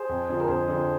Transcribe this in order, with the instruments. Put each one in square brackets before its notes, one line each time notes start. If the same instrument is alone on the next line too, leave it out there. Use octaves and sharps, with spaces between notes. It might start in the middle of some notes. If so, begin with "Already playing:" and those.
Already playing: [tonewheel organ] G#4 C5
[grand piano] F2
D3 F3
[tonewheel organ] A#4
[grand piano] F2 [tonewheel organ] G#4 C5
[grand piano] D3 F3